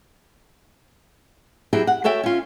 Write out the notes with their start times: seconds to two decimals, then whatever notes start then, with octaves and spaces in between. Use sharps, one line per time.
1.73 F#3 E4 G4 G#4
1.87 F#5
2.04 F#4 A4 C#5 E5 G5
2.24 C#4 F4